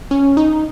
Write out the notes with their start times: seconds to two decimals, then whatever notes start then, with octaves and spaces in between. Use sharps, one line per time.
0.11 C#4
0.37 D#4